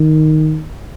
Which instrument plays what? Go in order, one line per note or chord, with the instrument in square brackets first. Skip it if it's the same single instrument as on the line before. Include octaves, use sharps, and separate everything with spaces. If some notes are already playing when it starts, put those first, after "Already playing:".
Already playing: [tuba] D#3